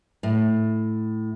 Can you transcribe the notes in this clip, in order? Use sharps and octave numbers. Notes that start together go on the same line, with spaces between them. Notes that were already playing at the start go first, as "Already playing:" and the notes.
A2